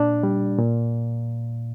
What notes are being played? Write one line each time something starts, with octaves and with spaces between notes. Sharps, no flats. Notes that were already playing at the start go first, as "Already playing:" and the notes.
Already playing: A#2 D4
G3
A#2